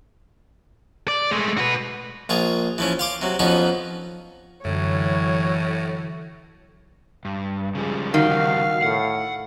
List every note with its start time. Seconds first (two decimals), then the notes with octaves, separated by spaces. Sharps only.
1.08 D5
1.31 G#3 A3
1.58 F#4 B4
2.29 A#1 F4 G#4
2.78 E3 F3 C#4
2.99 F5 C6 D6
3.21 C3 F#3
3.39 F2 F3 B3 C#4 D#4
4.65 F#2 A2 D3 E3 F#3 C#5
7.25 G2
7.75 C#3 F3 G3 G#3
8.14 D#3 F#4 F5
8.83 A2 F#5